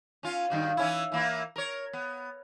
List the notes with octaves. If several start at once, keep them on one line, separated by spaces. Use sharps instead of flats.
C#4 F4
G2 D#3 F#4
E3 C#4 E4
E3 A#3 E4
A#4 C#5
B3